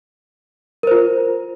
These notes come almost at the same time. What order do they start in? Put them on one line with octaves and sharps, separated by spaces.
A#4 C5 F4